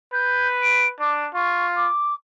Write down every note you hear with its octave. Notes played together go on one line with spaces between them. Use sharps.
B4 G6
D7
D4 D6
F4 C#6
D6